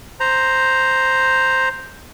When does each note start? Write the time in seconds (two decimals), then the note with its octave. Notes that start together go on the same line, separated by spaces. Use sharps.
0.20 C5 A#5